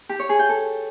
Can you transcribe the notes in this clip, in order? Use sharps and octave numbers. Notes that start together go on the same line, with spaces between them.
G4
C#5
G#4
G5
A4